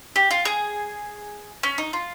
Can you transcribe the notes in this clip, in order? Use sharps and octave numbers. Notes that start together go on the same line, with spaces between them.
G4
F4
G#4
C#4
D#4
F4